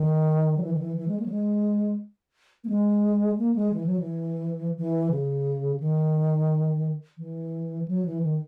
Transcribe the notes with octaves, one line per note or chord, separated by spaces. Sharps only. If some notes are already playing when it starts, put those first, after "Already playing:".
Already playing: D#3
F#3
E3
D#3
E3
E3
G#3
A#3
F#3
G#3
A#3
G#3
A#3
G#3
E3
F#3
E3
E3
C#3
D#3
E3
F#3
E3
D#3